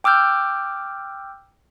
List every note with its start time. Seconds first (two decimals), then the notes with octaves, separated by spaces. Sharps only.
0.04 G5 D6 E6 F6 G6